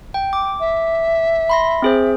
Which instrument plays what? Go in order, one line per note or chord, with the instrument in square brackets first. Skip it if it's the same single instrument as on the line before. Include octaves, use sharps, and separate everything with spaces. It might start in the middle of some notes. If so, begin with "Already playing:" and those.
[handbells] G5
D6
[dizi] E5
[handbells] B5 C6 A#6
C4 G#4 C5